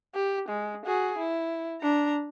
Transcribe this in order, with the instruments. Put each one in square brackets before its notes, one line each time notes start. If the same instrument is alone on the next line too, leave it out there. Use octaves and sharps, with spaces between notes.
[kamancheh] G4
G#3
F#4 G#4
E4
D4 A#5